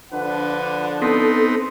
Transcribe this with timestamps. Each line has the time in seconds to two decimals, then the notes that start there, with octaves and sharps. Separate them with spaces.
0.13 D3 F3 D4 B4 F#5
1.02 B3 C4 D#4 A4 C6